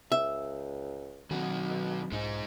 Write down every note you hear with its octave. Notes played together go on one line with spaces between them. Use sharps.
C#2 E5
B1 D#3 F#3 C4 F#4
B2
B1 G#2 F3 G#3 D#4